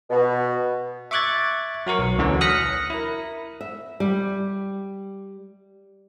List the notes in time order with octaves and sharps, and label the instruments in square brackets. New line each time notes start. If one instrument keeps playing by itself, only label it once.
[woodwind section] B2
[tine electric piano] E5 C#6 D6 F#6 G#6 A6
F#3 F#4 A#4 C#6
B1 F#3
D2 D3 E3 F#3 C#4
D#6 F6 F#6 A#6 B6 C#7
E4 A#4
[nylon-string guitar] E5
G3